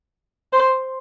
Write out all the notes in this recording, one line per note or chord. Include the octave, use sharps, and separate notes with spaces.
C5